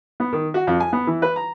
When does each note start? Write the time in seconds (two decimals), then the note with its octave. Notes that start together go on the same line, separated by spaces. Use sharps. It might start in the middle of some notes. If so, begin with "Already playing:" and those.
0.20 B3
0.33 D#3
0.54 F#4
0.67 F2
0.80 G#5
0.93 B3
1.07 E3
1.22 B4
1.36 A#5